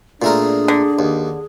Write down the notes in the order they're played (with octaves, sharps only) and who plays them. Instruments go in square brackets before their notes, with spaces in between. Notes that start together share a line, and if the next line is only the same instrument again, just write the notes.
[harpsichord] A#2 A3 A#4 [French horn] D4 [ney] G#4
[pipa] D3
[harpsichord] D#2